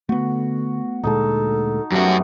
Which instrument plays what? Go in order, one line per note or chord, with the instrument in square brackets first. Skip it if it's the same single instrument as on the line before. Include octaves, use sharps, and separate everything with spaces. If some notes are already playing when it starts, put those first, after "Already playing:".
[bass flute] D3 [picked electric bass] A3 B3 [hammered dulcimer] F#4
[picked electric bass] D2 A#2 G#3 [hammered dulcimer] D#4 A5 [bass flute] A4
[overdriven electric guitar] F#2 F#4 [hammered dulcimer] G3 A3 B3